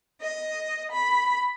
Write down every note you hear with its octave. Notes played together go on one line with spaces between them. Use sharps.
D#5
B5